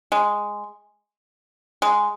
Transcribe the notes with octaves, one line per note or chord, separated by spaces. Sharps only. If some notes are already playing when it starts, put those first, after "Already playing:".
G#3
G#3